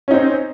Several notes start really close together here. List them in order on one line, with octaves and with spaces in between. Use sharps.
C#4 D#4 C4